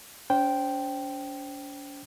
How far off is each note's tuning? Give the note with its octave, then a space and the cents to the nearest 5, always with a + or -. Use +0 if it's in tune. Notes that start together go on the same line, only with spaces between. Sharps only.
C#4 +45 C5 +0 G5 -5